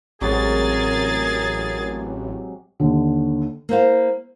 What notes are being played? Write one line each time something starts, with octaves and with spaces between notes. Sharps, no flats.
A1 C3 F#3 G#3 G#4 A#4 A6
D#2 D3
A#3 E4 C5 F5